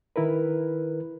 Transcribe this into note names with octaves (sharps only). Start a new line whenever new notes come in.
D#3 E4 A#4 B4